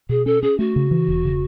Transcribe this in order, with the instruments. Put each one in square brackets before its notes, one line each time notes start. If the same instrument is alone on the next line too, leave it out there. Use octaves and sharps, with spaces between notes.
[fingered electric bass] B2 [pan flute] G#4
[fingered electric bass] C#4 [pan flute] A4
[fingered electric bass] C#4 [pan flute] G#4
[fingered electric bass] A3 [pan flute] F#4
[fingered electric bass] C#3
E3
E1
C#3